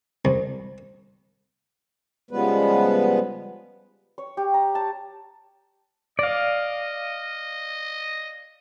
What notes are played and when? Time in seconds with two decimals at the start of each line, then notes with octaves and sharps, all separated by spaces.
0.25 C2
2.31 C#3 F3 G3 G#3 B3 B4
4.18 C#5
4.37 G4
4.54 A#5
4.75 A5
6.19 D5 D#5 F5